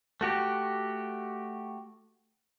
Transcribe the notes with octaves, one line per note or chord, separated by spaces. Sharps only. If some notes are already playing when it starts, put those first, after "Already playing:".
A3 F#4 G4